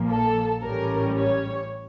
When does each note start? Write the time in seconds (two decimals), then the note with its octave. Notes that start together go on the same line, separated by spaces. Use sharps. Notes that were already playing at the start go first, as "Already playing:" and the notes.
Already playing: A#1 A#2 F3 A#3
0.09 A4
0.62 A1 A2 G3 C#4 A#4
1.17 C#5